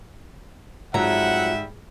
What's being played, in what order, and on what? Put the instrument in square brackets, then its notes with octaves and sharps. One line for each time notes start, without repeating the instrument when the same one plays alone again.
[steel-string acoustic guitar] F2 F#3 A#5 [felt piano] G#2 G#4 [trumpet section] G3 E5 [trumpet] F#5